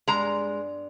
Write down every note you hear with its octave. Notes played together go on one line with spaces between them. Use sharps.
G2 G#3 B3 F4 A#5